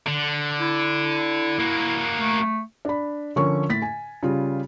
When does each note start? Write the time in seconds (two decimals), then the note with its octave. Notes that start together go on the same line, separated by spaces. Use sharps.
0.07 D3
0.60 E4
1.59 A#3 F#4
2.18 A3
2.85 D4 B5
3.36 D3 F3 C#4 A#4 C#5 C#6
3.69 A2 A6 B6
3.82 G#5
4.23 C#3 G3 F4